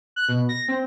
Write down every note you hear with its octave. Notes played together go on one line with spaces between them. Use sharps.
F#6
B2
A#6
C4